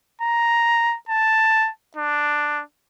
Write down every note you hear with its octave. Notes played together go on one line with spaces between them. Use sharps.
A#5
A5
D4